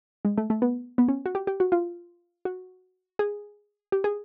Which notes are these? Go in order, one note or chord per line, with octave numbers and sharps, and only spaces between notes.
G#3
A3
A3
B3
B3
C#4
F#4
G4
G4
F#4
F4
F#4
G#4
G4
G#4